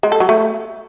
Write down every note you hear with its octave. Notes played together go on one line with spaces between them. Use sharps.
G#3
A4
F#3
A3